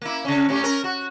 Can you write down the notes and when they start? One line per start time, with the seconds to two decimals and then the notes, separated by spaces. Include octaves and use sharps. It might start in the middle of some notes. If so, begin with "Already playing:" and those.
0.02 A#3 E4
0.25 C#3 C#4
0.49 A2 C#4 G4
0.63 C#4 A#4
0.84 F#4